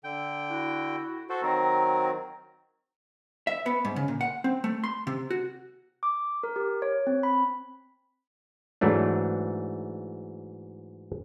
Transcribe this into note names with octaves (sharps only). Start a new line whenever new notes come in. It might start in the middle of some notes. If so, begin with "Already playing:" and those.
D3 G5
E4 F#4
F#4 A4 C5
D#3 F#3 C4 A#5
E5
B3
G#2
C#3
A#2
F#5
C4
A3
C6
C3
F#4
D6
A#4
G4
C#5
C4
B5
G#2 E3 F#3 A3 D4